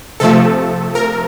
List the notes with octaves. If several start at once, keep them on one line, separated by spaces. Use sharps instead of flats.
C3 F3 A3 A4
A#4